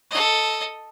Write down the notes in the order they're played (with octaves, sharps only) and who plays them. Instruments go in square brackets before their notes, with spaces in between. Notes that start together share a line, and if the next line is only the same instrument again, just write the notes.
[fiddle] A4 D#5